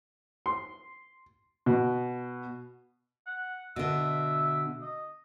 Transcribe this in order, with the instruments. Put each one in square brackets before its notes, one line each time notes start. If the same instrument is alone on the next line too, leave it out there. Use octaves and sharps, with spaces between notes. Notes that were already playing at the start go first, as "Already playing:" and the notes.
[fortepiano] C6
B2
[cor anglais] F#5
[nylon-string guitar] B2 D3 [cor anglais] E5
[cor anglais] D#5